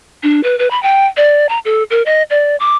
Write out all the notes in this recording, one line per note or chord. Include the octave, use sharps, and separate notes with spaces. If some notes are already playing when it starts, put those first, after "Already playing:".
D4
B4
B4
B5
G5
D5
A#5
A4
A#4
D#5
D5
D6